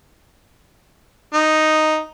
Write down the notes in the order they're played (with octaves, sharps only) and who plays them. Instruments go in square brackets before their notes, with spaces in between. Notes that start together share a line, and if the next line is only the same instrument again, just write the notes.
[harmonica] D#4